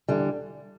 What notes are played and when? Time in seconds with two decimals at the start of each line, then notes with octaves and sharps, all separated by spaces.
0.08 E2 D3 G3